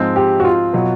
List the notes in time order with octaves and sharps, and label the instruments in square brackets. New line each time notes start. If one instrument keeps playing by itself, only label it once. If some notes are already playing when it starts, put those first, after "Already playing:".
Already playing: [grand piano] G#2 F3 G#3 C4
[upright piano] G4
F#4
F4
[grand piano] B2 F#3 B3